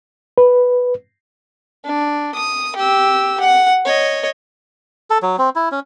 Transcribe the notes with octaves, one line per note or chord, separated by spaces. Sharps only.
B4
D4
D#6
G4 E6
F#5
C#5 D#5
A4
F#3
C4
E4
C#4